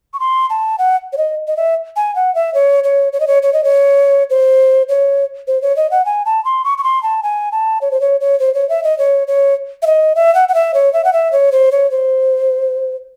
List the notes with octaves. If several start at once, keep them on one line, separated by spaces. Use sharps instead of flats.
C#6
C6
A5
F#5
C#5
D#5
D#5
E5
G#5
F#5
E5
C#5
C#5
C#5
D#5
C#5
C#5
D#5
C#5
C5
C#5
C5
C#5
D#5
F#5
G#5
A5
C6
C#6
C#6
C6
A5
G#5
A5
C#5
C5
C#5
C#5
C5
C#5
E5
D#5
C#5
C#5
E5
D#5
E5
F#5
F#5
E5
C#5
E5
F#5
E5
C#5
C5
C#5
C5